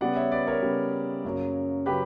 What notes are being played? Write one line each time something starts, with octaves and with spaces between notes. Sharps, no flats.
C#3 G3 B3 D5 F#5
C#5 E5
B4 D5
A#4 C#5
C#3 G3 B3
F#2 C#3 F#3 A#3
C#3 F#3 G4 B4